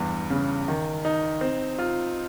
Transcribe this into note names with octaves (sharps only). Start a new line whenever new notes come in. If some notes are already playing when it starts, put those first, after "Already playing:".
Already playing: E2 G2
C#3
D#3
D#4
C4
F4